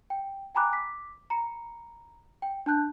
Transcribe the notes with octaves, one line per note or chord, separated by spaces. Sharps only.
G5
G5 G#5 A#5 B5 D6 F#6
D6 B6
A#5 B5 C#7
G5
D4 A5 F#6 G6